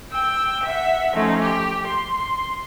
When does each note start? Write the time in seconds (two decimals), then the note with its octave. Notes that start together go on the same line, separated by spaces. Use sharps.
0.12 G5 E6
0.64 E5 F#5
1.13 F3 A3 C#4 D#4
1.41 G4
1.85 C6